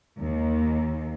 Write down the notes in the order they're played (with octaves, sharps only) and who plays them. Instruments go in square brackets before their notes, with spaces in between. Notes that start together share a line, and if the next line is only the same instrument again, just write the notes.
[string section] D#2